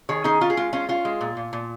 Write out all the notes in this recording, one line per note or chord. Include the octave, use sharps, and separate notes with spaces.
D#3 G#4 C#5
C#4 D#4 G#4
C#4 F4
G#4
G#3 F4
C#4 F4
C#4 F4
G#3
A#2
A#2
A#2